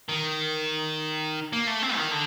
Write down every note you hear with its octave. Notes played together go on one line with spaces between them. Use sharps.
D#3
A#3
A3
C4
D#3
D3